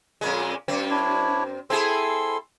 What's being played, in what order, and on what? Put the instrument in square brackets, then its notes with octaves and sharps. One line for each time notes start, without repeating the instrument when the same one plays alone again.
[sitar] F2 A#2 G#3
F#2 C4
[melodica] D4 E4 C#5
[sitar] C4 E4 G#4 [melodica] A4 C6 E6